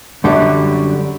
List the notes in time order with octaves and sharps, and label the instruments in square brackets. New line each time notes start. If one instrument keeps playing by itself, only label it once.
[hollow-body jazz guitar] F#2 D3 F#3 G3